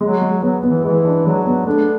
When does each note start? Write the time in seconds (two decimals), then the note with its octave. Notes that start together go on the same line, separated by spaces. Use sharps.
0.01 F#3 G#3
0.22 G#3
0.42 F#3 B3
0.63 B3
0.70 E3
0.84 E3 G#3
1.05 D4
1.26 F#3 G#3
1.46 B3
1.66 A3 D4